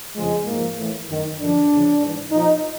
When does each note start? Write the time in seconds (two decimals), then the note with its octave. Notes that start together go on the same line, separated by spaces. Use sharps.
0.16 F2 C#3 F3 G#3
0.47 G#2 F3 A#3
0.78 A2 E3
1.09 F#2 D#3
1.39 F#2 D3 F3 D4
1.70 E2 C#3 F3
2.01 G#2 E3
2.32 A#2 F3 D#4